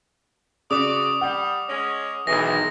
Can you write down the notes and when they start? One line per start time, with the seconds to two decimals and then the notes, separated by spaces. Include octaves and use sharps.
0.71 C#3 F#4 D5 D6 D#6
1.21 G3 F#5
1.69 G#3 C#4
2.27 B1 D#3 E3 G#3 A#6